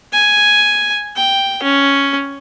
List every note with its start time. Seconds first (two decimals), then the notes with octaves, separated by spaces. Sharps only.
0.13 G#5
1.16 G5
1.63 C#4